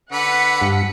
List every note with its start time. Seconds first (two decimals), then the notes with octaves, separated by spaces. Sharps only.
0.12 D3 B4 F#5 B6 C#7
0.62 G2